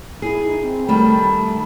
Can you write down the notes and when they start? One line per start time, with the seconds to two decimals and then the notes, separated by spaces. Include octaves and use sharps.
0.22 E4 G#4
0.46 D#4
0.62 C4
0.88 D#3 G3 A3 B5